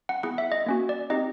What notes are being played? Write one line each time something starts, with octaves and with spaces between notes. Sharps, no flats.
F#5
B3 E4 G#4 F#5
E5
D#5
A#3 C#4 F#4
D5
C4 D#4 G4 D#5